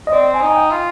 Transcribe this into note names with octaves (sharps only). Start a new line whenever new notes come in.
D#5
C4 D5
G#5
D#4
G#5
G5
F4